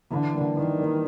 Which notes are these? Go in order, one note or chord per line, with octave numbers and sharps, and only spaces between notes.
D3 E3
G3 A#3 D4
D#3 E3
G3 A#3 D4